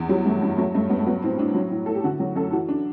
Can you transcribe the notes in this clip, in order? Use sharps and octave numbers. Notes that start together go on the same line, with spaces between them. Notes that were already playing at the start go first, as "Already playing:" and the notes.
Already playing: E2
F#3 G3
G2 A3
G2
F#3 A3
G2 A3
G2 B3
A3
F#3 B3
A2 C4
A2 D4
F#3
A2
A2 A4
G4
D3 F#4
F#3 F#4
F#2 A4
E3 F#4
D4